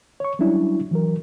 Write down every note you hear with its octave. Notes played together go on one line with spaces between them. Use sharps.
C#5 C#6
F#3 G3 C#4 D4 E4
E3 F#3 A#4